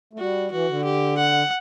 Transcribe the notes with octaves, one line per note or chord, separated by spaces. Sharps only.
A3
G3 F#4
E3 F#4
D3
G4
F#5